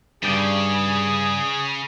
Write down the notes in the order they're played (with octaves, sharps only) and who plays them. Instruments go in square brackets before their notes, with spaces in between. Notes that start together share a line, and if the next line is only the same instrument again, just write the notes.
[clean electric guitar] G2 D5 G5 [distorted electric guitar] C#3 [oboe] G#4